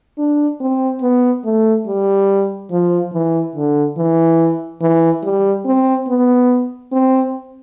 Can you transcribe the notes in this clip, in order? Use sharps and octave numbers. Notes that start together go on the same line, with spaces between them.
D4
C4
B3
A3
G3
F3
E3
D3
E3
E3
G3
C4
B3
C4